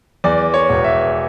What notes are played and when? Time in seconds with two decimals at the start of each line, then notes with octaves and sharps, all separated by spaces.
0.24 E2 D5
0.54 C#5
0.69 E1
0.84 E5